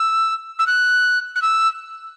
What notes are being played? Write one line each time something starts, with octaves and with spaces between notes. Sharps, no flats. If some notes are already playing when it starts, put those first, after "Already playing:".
Already playing: E6
E6
F#6
F#6
E6